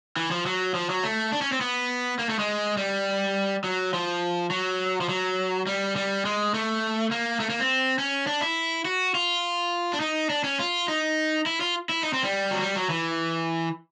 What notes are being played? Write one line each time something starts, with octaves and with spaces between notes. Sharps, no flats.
E3
F3
F#3
F3
F#3
A3
D4
C#4
C4
B3
A#3
A3
G#3
G3
F#3
F3
F#3
F3
F#3
G3
G3
G#3
A3
A#3
A3
A#3
C4
C#4
D4
E4
F#4
F4
D4
D#4
D4
C#4
F4
D#4
E4
F4
E4
D#4
C4
G3
F#3
G3
F#3
E3